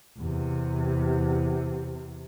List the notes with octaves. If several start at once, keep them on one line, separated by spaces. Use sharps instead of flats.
E2 C3